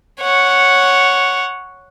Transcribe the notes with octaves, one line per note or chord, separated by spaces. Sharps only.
C#5 F#5